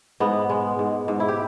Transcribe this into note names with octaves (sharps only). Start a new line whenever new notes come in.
G#2 B3
G#3
G#2
G#2
E4
G4